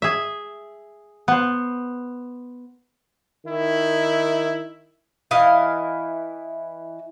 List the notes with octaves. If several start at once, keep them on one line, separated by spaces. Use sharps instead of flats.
G#4 E5
B3 C5
D#3 E4
E3 E4 D#5 F5